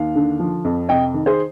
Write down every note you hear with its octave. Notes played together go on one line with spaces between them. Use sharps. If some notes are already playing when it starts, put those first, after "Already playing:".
Already playing: D#2 F5
D3
F3
F2
C3 D#5 G5
D#3
G#4 C5